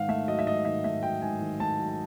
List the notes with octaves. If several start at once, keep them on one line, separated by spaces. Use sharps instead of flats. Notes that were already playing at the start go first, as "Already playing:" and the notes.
Already playing: G#2 D#3 F5 F#5
A3 E5
F#3 D#5
E5
G#2 D#5
D#3 E5
A3 E5
F#3 G5
G#2 G#5
D#3
A3 A5
F#3
A5